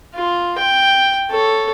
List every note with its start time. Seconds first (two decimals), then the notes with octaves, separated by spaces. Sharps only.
0.14 F4
0.58 G5
1.30 A4 C#5